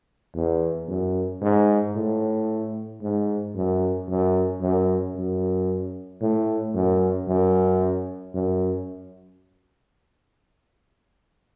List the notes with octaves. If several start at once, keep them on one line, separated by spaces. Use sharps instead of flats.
E2
F#2
G#2
A2
G#2
F#2
F#2
F#2
F#2
A2
F#2
F#2
F#2